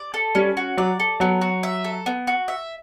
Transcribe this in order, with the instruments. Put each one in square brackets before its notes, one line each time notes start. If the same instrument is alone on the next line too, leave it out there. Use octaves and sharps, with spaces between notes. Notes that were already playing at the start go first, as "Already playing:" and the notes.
Already playing: [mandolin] D5
A4
[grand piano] G3 [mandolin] C#4
[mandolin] F#4
[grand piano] F#3 [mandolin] D5
[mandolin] A4
[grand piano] F#3 [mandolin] B3
[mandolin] F#4
E5
A4
B3
F#4
E5